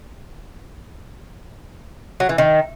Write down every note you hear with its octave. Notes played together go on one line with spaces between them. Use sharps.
F#3
E3
D#3